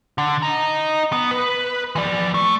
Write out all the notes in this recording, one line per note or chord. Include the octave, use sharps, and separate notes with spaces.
D3
D#5 A#5
B3
B4
E3 D5
A3